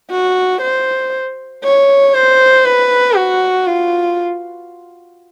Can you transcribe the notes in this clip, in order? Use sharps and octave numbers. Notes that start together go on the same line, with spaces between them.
F#4
C5
C#5
C5
B4
F#4
F4